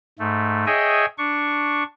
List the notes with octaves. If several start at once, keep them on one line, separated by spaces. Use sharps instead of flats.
G#2 A3
G#4 C#5 D#5 E5 G5 G#5
D4 C#6